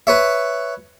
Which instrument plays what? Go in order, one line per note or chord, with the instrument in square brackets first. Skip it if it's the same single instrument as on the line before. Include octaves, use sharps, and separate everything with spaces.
[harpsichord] B4 C#5 E5